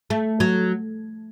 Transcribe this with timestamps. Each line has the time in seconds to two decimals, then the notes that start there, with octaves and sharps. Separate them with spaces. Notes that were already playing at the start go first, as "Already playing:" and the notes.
0.10 A3
0.40 F#3